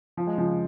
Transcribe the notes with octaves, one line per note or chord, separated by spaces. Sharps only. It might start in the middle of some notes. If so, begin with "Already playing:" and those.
F3
G#3
C#3 F3